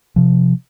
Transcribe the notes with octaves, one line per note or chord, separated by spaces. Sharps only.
C3 F3